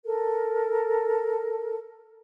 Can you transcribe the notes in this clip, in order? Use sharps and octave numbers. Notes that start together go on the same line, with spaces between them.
A4 A#4